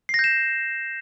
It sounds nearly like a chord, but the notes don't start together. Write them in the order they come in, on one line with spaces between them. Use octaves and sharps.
C7 A#6 G6 E7